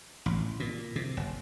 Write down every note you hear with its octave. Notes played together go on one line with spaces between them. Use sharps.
A1
A#2
C3
F#1